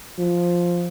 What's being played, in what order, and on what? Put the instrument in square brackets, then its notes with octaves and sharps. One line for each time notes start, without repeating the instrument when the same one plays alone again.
[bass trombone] F3